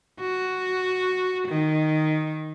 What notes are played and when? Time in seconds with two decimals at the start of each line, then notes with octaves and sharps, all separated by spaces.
0.19 F#4
1.48 D#3